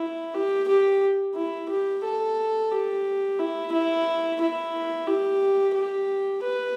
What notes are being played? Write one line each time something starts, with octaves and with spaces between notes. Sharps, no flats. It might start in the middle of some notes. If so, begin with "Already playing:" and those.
Already playing: E4
G4
G4
E4
G4
A4
G4
E4
E4
E4
G4
G4
B4